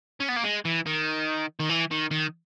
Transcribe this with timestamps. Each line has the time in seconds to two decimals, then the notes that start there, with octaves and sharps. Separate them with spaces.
0.20 C#4
0.29 B3
0.36 A#3
0.44 G#3
0.65 E3
0.86 D#3
1.60 D#3
1.69 E3
1.91 D#3
2.11 D#3